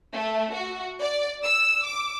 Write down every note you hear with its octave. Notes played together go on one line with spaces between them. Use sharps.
A3
F#4
D5
E6
D6